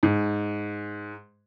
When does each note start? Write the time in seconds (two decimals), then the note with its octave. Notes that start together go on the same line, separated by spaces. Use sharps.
0.03 G#2